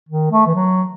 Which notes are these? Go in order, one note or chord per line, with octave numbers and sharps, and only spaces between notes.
D#3
A3
E3
F#3